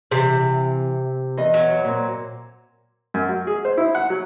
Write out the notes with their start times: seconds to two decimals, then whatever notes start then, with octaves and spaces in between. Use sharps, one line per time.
0.11 C3 E3
1.37 E2 D#5
1.54 F#3
1.85 A#2 C4
3.14 F#2
3.29 F#4
3.47 G#4
3.65 C5
3.77 E4
3.95 F#5
4.10 F#3